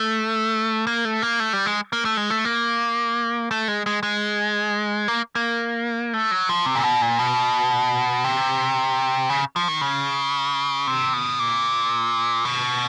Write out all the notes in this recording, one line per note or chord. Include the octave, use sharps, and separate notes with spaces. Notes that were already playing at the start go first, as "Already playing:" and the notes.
Already playing: A3
A#3
A3
A#3
A3
G3
G#3
A#3
A3
G#3
A3
A#3
A3
G#3
G#3
G#3
A#3
A#3
A3
F#3
F3
C3
A#2
B2
A#2
B2
C3
C#3
F3
D#3
C#3
C3
B2
A#2
B2